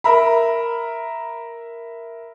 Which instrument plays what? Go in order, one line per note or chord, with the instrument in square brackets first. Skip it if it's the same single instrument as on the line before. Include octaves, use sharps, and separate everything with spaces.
[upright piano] A#4 E5 A#5 B5